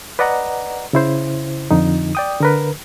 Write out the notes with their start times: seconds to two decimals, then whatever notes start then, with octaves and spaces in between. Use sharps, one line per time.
0.19 B4 D5 D#5 F#5 A#5
0.93 C#3 E4 C5
1.71 F2 D3 D#4
2.15 D5 G5 D#6
2.41 D3 A#4 B4